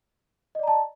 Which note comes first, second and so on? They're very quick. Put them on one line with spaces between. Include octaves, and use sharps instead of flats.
D#5 D5 A#5 A5